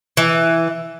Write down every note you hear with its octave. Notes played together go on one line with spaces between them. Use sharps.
E3